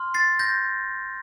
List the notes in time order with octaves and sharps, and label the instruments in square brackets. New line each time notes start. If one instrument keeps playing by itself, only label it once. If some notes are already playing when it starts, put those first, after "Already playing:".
Already playing: [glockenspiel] C6 F6
A6 C7
G6 A#6